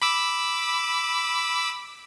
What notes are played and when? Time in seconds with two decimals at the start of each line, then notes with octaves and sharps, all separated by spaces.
0.02 B5 D6 E6